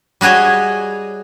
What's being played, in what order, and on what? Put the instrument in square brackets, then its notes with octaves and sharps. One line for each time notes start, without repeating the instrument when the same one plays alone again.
[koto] G3 F#4 G#4 C#5 D#5